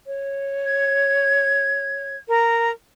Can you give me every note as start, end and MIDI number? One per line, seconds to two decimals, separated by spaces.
0.07 2.15 73
0.66 2.18 92
2.30 2.71 70
2.30 2.71 82